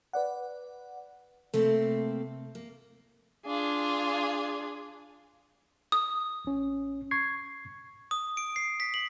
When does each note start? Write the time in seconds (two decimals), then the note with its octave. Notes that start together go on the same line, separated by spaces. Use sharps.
0.13 B4 D5 F#5
1.54 C3 A3 A#3 C4 A4
2.55 A#3
3.46 D4 F4 G#4
5.92 D#6
6.45 A1 C#4
7.11 C#6 G#6 C7
8.11 D#6
8.37 D7
8.56 C7
8.80 B6
8.94 F#7